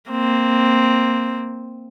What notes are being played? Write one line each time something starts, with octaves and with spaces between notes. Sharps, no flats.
A#3 C4